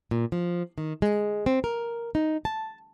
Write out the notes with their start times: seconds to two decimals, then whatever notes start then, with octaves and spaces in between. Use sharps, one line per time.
0.11 A#2
0.32 F3
0.78 D#3
1.02 G#3
1.46 C4
1.64 A#4
2.15 D#4
2.45 A5